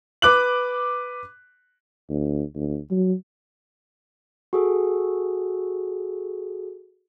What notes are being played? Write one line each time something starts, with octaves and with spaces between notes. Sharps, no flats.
B4 D6 F#6 F#7
D2
D2
F#3
F#4 G#4 A4